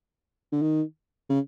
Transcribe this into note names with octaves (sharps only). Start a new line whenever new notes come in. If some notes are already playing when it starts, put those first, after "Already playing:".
D3
D#3
C#3